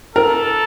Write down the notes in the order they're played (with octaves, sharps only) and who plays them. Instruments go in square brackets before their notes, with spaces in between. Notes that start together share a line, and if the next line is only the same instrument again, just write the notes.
[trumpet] A4 [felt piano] A#4